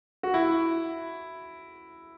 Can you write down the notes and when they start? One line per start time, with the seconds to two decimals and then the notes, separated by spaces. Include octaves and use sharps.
0.23 F#4
0.34 E4